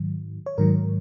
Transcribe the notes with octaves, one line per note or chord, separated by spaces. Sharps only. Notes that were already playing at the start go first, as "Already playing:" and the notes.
Already playing: G#2 D#3 F#3
C#5
G#2 D#3 F#3 A#4